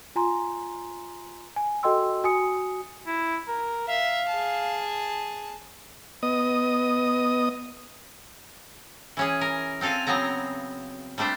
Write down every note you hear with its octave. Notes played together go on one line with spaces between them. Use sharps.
F4 G#5 A#5 C6
G#5
F#4 A4 D#5 G5 C6 E6
F#4 G#5 D#6 C#7
E4
A#4
E5 F5
G#4 A5
B3 D#5 D#6
E3 C#4 G#4
A#4
C4 F4 A4 F5 G#5
C#3 F#3 B3 C4 A#5
G3 A3 D4 C5 E5